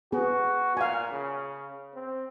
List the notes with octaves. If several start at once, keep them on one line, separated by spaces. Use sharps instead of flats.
B3 F#4 G#4
A#2 F5 G#5
C#3
C4